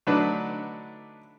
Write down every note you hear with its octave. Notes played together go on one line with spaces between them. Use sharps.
D3 F#3 A3 D4 D#4 B4